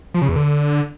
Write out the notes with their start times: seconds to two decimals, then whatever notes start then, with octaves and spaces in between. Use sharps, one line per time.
0.14 F3
0.22 C#3
0.29 E2
0.36 D3